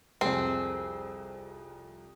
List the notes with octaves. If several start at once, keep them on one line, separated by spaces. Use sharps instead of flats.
C2 F2 C4 G#4 A4